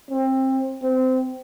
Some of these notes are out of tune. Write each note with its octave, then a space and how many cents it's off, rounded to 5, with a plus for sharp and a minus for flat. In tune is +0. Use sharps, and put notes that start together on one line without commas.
C4 +20
C4 -20